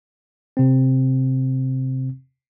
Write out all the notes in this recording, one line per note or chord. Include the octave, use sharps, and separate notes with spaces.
C3 C4